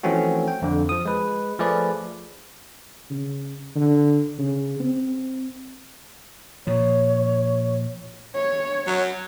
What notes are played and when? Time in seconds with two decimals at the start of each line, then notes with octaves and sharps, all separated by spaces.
0.03 E3 F3 A3 C4 C#4 F#4
0.48 G5
0.62 F2 D3
0.89 F3 D#6
1.05 G#3 B4
1.59 F3 A3 G#4 B4 D5
3.10 C#3
3.76 D3
4.39 C#3
4.80 C4
6.67 A#2 F3 C#5
8.34 C#5
8.87 F#3